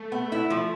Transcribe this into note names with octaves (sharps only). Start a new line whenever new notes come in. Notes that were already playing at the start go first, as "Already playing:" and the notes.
Already playing: A3
B3
E4
F3